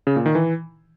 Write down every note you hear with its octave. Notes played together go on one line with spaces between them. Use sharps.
C#3
A#2
D#3
E3